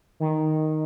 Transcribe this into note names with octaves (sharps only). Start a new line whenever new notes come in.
D#3